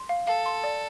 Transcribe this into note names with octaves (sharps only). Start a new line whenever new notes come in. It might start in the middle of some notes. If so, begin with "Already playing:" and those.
Already playing: C6
F5
A4 F5
C6
D5